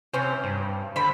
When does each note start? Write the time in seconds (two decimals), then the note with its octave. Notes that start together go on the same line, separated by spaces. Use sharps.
0.13 C3 C#4 C5
0.44 G2
0.96 D3 C5 B5